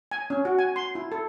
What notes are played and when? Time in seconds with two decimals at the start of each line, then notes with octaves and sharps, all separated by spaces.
0.11 G#5
0.30 C#4
0.45 F#4
0.59 G#5
0.76 C6
0.95 E4
1.12 A4